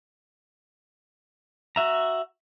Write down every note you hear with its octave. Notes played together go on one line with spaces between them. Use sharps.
F#4 E5 A#5